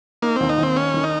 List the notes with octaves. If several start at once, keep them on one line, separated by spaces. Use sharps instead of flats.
A#3 D#4
D#2 C4
D#4
D#2
C4
C#4 D#4
D#3
D#4